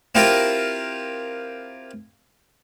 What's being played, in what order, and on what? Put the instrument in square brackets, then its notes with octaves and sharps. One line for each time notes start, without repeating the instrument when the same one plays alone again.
[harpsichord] C4 E4 F4 G4 A#4